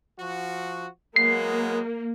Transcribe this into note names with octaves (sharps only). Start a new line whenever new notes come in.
F3 F#4
F#3 G#3 A#3 B3 C7